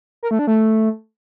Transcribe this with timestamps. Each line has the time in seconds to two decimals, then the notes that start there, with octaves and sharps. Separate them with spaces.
0.23 A#4
0.31 A3
0.39 D4
0.47 A3